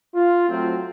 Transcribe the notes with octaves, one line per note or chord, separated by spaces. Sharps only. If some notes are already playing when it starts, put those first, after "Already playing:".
F4
F#3 A3 C4